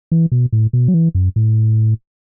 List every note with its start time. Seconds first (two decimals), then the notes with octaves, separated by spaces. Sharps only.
0.12 E3
0.32 B2
0.53 A2
0.73 B2
0.88 F#3
0.94 E3
1.15 F#2
1.36 A2